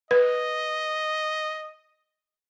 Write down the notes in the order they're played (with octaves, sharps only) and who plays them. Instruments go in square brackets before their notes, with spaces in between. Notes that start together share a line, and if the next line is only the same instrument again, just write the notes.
[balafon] B4 [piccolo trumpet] D#5